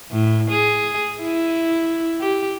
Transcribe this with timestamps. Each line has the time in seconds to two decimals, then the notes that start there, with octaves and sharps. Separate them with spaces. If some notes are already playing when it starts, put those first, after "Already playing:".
0.11 A2
0.51 G#4
1.22 E4
2.21 G4